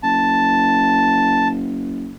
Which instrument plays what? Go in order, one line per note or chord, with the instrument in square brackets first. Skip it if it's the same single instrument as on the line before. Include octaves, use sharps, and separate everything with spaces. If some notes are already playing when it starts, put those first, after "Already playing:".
[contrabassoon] F#1 [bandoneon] A5